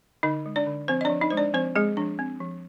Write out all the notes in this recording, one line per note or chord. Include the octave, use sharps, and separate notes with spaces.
D3 D#4 D#5
G#3
D4 D5
D3
F3 C4 C5
D#5
D4 D5
F3
D#4 D#5
G#3 C5
D4 D5
F3 C4 C5
G#3 C4 G#4
F3 D4
C4
F3